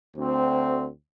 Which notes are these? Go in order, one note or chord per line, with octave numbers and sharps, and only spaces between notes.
D2 C4